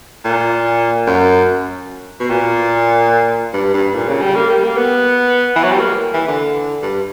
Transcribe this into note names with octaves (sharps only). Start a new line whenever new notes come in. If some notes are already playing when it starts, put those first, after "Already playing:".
A#2
F#2
B2
A#2
G2
G2
A#2
C#3
G3
A#3
G3
A#3
B3
E3
F#3
G3
A#3
E3
D3
G2